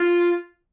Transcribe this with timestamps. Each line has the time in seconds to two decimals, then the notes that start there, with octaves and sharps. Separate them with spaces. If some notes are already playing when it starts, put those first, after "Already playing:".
Already playing: F4